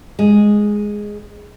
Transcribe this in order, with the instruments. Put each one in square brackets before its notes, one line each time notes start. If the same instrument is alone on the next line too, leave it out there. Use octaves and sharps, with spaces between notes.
[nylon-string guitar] G#3